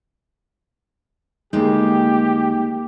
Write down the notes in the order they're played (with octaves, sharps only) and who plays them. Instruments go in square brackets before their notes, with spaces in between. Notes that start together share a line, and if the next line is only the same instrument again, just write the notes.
[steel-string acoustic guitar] D2 G#3 [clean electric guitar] A#3 D#4 [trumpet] G4